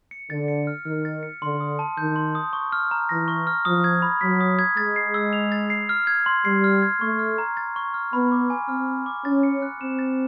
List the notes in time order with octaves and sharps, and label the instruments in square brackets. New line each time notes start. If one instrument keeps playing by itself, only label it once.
[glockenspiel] C#7
[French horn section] D3 [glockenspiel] A6
[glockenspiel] C#7
F6
[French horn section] D#3 [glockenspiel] F6
[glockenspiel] A6
C#7
[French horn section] D3 [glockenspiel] C6
[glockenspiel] D#6
A5
[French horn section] D#3 [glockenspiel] G6
[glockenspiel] C6
D#6
C#6
F6
A#5
[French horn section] E3 [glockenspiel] A#6
[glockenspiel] C#6
F6
[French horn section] F3 [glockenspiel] D#6
[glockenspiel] G#6
B5
[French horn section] F#3 [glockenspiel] B6
[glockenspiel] D#6
G#6
[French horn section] G#3 [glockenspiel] A6
[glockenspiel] C7
E6
F7
A6
C7
F6
G#6
C6
[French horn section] G3 [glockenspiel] C7
[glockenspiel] F6
G#6
[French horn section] A3 [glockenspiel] C#6
[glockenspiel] F6
A#5
A6
C#6
F6
[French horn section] B3 [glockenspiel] B5
[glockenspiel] D6
G#5
[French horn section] C4 [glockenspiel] F6
[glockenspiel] B5
D6
[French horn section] C#4 [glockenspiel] A6
[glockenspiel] C#7
F#6
[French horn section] C4 [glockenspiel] E7
[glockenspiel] A6